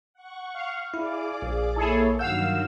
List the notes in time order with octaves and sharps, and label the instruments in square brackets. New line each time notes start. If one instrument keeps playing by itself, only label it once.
[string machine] F#5 C#6
[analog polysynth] F5
[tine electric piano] E4 [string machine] G#4 D5 D6
[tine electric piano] A#1
[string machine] A#3 C#5 [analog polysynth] E4 G#4 A4
[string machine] G2 D#3 F#3 [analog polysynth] F5 E6 [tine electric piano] F#5 G6